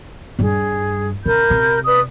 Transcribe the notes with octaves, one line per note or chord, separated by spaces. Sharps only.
G2 G3 G#4
C#3 A#4 B5 G6
C3
B4 D5 D#6